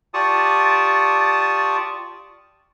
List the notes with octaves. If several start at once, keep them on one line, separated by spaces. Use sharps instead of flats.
F4 G4 D5 A5 C#6 D#6